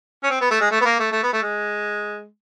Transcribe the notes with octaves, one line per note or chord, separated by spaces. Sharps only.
C#4
C4
B3
A3
G#3
A3
B3
A#3
A3
A3
B3
A3
G#3